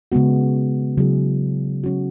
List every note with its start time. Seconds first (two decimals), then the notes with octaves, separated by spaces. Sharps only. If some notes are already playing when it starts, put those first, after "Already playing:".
0.12 C#3 G#3 B3 F#4
0.98 C#3 F#3 B3 E4 G#4
1.84 F#3 C#4 F#4